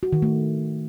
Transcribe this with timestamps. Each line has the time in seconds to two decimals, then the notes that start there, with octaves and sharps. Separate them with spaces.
0.03 F#4
0.13 D#3
0.22 A3